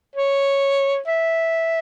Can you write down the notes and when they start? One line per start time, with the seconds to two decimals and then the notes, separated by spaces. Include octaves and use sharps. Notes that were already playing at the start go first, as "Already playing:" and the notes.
0.16 C#5
1.07 E5